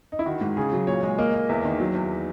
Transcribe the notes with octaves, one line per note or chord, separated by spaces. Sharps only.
D#4
E4
D#3 F#4
G#2
C#3 G#4
F#3
A#2 C#5
G#3
A#3 D#5
A#3
E2 E5
D#3
F#3
E2